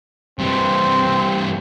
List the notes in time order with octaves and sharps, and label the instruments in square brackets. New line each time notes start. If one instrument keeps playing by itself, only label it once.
[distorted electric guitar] G2 E3 [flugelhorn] C4